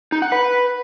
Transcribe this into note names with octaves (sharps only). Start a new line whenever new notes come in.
D#4
F#5
B4